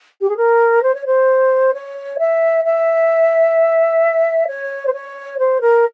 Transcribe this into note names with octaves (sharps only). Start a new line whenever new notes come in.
G4
G#4
A#4
C5
C#5
C5
C#5
E5
E5
C#5
C5
C#5
C5
A#4